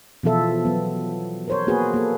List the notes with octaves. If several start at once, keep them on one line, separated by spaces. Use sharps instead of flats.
B2 E3 F3 F4 A4 E5
F#3 B3
A#4 C5 C#5
A#3 B3 F#4 G#4 B4
A#3 A4